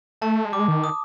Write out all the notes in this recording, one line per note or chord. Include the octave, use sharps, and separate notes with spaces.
A3 A5
G#3
G3 D6
G#3
D#3
D#6